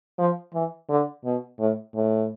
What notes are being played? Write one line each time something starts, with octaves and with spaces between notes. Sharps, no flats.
F3
E3
D3
B2
A2
A2